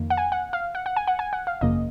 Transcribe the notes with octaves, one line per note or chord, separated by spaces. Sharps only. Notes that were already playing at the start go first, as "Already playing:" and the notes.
Already playing: F2 D#3 A#3
F#5
G#5
F#5
F5
F#5
F#5
G#5
F#5
G#5
F#5
F5
G#1 F#2 C#3 F3 A#3 D#5